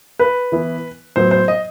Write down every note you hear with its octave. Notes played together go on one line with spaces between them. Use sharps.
B4
E3 B3 E4
A2 F#3 B3 E4 C5
C5
D#5